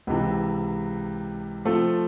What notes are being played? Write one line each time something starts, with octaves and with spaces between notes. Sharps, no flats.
C#2 C3 E3
F3 A3 C4 F4 A4